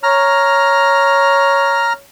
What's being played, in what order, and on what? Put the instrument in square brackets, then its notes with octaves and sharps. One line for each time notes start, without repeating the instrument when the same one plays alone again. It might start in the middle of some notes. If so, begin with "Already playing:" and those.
[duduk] C#5 [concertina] A#5 F6